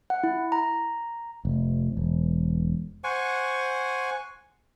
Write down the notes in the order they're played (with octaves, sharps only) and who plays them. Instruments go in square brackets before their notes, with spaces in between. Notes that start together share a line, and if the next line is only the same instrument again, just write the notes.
[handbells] F#5
E4
A#5
[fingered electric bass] F1
E1
[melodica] C5 F#5 G#5 C#6